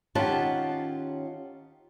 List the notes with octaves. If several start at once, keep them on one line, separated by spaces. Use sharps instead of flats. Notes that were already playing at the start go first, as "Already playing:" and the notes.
D#3 C#4 F4 G4 F#5 A5